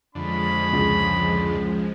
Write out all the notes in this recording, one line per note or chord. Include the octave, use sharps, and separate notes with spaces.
F2 D3 F3 G#3 C#4 D#5 B5
C#2